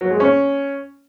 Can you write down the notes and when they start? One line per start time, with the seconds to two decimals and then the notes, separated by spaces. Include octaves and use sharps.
0.01 F#3
0.10 G#3
0.20 C#4